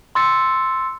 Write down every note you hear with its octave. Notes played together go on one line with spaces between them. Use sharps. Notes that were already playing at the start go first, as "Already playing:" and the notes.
C6 E6 A6 C#7